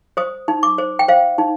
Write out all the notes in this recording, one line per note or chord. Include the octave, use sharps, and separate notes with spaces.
C5 D#6
D#4
D6
C5
G5
C5 F5
D#4